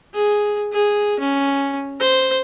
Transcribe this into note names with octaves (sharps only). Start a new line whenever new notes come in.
G#4
G#4
C#4
C5